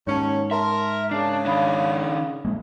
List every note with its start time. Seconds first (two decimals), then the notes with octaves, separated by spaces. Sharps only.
0.07 D#2 G#2 C#4 C#5 A5
0.51 A#4 E5 A5 C6
1.11 C#3 D4 A5 C7
1.45 D#3 D4 F5 B5 D#6
2.45 A#1 G#3 A#3